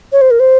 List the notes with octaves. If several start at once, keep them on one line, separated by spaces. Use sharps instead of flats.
C#5
C5
A#4
C5